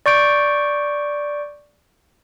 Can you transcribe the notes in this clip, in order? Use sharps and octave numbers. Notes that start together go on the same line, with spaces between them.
D5 C#6 G6 D7